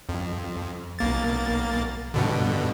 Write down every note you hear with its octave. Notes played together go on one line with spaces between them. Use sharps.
F2
B1 A#3 A6
G2 B2 D3